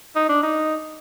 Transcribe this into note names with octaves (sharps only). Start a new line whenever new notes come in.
D#4
D4
D#4